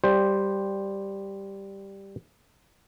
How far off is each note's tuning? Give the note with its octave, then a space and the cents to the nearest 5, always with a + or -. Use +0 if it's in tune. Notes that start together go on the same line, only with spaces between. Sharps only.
G3 +0 C5 +0